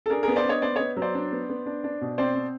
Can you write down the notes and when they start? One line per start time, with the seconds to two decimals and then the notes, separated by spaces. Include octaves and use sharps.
0.06 A4
0.10 D4 G#4 A#4
0.23 B3 G#4 A#4
0.36 C5 D5
0.45 D4 C#5 D#5
0.62 B3 C5 D5
0.76 B3 C#5 D#5
0.97 F#3
1.02 C5 D5
1.15 D4
1.32 B3
1.49 B3
1.66 D4
1.84 D4
2.01 B2
2.18 C4 C5 D5
2.35 C4